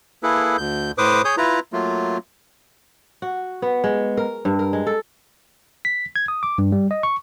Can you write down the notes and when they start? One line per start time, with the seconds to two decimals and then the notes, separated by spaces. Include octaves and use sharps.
0.23 A#3 E4 G#4 A4 B4
0.58 D2 G6
0.98 A2 B4 C5 D6 D#6
1.25 G#4 C#5 D#6 G6
1.37 E4 F4 B4 A#5
1.73 F#3 A3 A#3 F4
3.22 F#4
3.62 B3
3.84 G#3
4.17 A#4
4.45 G2
4.59 A#4
4.73 G#3
4.87 A4
5.85 B6
6.16 G#6
6.28 D#6
6.43 D6
6.58 G2
6.72 G3
6.91 D#5
7.03 C#6